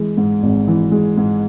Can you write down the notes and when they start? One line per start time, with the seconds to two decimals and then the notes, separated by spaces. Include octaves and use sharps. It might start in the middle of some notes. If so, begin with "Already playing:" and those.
Already playing: E3 G#3
0.17 G#2
0.43 G#1
0.68 E3
0.92 G#3
1.17 G#2